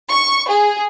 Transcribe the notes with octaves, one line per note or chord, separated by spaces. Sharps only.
C#6
G#4